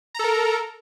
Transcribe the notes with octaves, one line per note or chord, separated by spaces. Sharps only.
A4 A#4 A#5